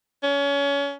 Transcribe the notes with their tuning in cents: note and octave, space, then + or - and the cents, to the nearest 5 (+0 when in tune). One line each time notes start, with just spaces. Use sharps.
C#4 +30